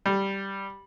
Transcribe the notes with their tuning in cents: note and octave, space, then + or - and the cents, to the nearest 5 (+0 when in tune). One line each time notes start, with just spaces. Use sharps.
G3 -5